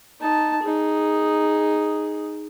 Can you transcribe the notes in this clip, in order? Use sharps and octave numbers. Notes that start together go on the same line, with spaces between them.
D#4 A5
D#4 G#4